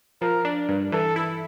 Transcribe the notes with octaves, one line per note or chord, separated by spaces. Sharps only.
F3 A#4
D4
G2
E3 A4
E4